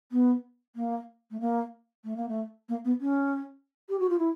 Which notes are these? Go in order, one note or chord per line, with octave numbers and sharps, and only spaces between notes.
B3
A#3
A3
A#3
A3
A#3
A3
A#3
B3
C#4
G4
F#4
F4
E4